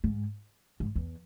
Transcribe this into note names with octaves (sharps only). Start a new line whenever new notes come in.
G#2
G#2
E2